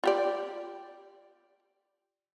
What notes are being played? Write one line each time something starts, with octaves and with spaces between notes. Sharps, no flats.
F4 G4 D5